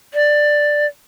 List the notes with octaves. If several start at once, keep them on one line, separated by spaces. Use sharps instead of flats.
D5